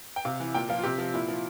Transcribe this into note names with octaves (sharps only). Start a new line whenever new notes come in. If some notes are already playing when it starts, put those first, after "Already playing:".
G5
C3 F5
E3
A#2 G5
F3 F5
F4
C3 G4
F3
A#2 E4
F3